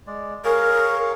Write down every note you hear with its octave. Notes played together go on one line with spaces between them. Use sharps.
G#3 D5
G#4 A#4 C#5 F5